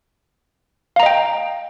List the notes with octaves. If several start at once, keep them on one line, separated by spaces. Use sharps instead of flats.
D#5 F5 G5 A#5